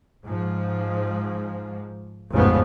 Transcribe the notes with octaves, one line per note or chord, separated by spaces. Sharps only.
G#2 F3
A1 F2 G#2 C#3 F3 B3